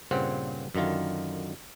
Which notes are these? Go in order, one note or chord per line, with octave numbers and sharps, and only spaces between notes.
G2 A#2 C#3 C4 C5 F#5
F#2 D3 D#3 F4